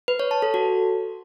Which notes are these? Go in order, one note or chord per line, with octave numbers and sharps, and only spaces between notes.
B4
C#5
A5
A4
F#4